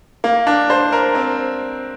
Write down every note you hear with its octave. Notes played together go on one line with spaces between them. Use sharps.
A#3
D4
C5
A#4
C4